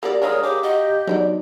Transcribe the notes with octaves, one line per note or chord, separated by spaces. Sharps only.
A#3 F#4 G4 D5
G3 G#3 D4 A#4 C#5 F5 A#5 D#6
G#3 G4 D6
F#4 D#5
F#3 B3 D4 D#4 C5 D5